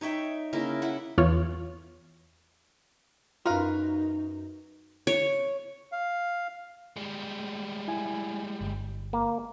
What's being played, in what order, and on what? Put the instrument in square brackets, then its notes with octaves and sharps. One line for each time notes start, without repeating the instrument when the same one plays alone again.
[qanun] D#4 C#5 E5 G5
C#3 A#3 E4 A#4
E4 F#5 B5
[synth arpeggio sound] E2 F4 C#5
[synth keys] F#2 F#4 [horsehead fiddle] D#4 [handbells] F4 [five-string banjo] A#4 B4 F5
[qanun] C#5
[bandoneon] F5
[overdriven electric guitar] G3 G#3
[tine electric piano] E4 G#5
G1
[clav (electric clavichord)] A#3